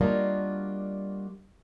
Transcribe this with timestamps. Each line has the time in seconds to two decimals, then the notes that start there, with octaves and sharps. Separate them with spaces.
0.01 G3 A#3 D4 F4 F#4 D#5